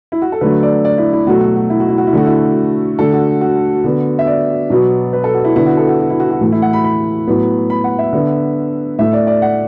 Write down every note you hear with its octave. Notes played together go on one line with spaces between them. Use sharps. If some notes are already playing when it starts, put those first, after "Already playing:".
E4
F#4
A4
D3 F#3 A3 B4
D5
D5
E4
E4
B2 F#3 A3 F#4
F#4
F#4
E4
F#4
E4
F#4
E4
D3 A3 F#4
E4
D3 A3 A4
F#4
F#4
D3 B3
E5
D5
B2 F#3 B3
B4
A4
F#4
E4
D3 B3 E4
F#4
A4
F#4
F#4
E4
F#4
F#4
A2 E3 A3
E4
F#5
B5
B5
A2 F#3 B3
B5
F#5
E5
D3 B3
A2 A3 E5
D5
D5
F#5